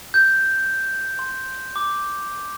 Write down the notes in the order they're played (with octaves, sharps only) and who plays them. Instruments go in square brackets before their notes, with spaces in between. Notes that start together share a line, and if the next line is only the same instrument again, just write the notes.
[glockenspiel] G6
C6
D6